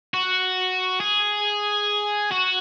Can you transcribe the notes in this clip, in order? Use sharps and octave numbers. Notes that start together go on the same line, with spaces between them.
F#4
G#4
F#4